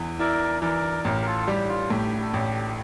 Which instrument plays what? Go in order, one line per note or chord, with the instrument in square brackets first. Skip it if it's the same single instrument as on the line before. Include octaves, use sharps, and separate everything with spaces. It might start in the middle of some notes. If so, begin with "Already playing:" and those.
Already playing: [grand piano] E2 E3
[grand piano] E4 [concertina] A#4 D5
[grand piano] E3 [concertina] A#4 D5
[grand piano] A1 [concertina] G4 A#4
[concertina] A#4
F4 A4
[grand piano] G3 [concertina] G4
[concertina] F4
[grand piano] A2 [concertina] G4
[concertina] A4
[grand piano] A1 [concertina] G4